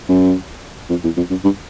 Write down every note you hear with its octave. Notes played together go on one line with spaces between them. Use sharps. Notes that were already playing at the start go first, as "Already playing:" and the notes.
F#2
F2
E2
F2
F#2
G2